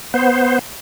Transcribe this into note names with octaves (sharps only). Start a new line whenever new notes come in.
B3 C5